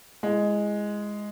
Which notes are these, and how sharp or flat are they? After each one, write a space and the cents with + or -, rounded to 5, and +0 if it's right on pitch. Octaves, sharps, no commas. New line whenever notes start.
G#3 +0 E4 +25